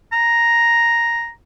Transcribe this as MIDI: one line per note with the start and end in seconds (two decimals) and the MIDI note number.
0.13 1.30 82